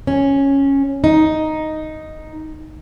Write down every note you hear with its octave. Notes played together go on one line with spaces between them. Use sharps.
C#4
D#4